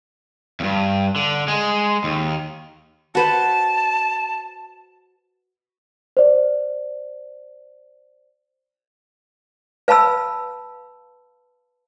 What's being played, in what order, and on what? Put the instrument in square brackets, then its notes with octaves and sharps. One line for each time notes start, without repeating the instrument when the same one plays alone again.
[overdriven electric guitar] E2 G2
D3
G#3
D#2
[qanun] F#4 B4 C5 [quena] A5
[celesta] C5 D5
[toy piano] B4 F5 A5 B5 E6